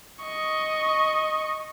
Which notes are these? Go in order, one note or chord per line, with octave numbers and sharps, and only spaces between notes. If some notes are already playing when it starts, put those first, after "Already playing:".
D#5 C#6